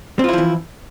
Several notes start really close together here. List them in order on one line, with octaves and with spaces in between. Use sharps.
C4 F4 E4 F3 E3